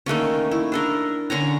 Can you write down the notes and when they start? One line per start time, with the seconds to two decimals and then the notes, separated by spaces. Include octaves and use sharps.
0.06 D#3 A3 A#3 C#4
0.51 E4
0.72 D4 A4 A#4
1.30 D3 C#4 C#5 A#5